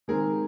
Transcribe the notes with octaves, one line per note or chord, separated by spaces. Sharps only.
D#3 G#3 C4 G#4 A#4